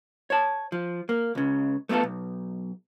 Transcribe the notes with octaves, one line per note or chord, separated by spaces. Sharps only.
C#5 A5
F3
A#3
C#2 C#3
A3 B3 E4 F4 A4
B1